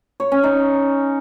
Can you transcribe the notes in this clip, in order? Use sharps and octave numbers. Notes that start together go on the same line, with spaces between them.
C#5
C#4
D#4